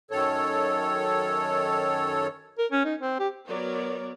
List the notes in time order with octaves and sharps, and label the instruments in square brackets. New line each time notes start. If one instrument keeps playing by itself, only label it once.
[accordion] F#2 D#3 A4 C#5
[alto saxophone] A#4
C#4
D#4
C4
G4
[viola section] F#3 B3 A#4 C#5 D5